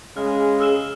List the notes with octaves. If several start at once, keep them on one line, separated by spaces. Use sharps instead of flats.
C#3 G#3 F6
G#4 E6 F6 E7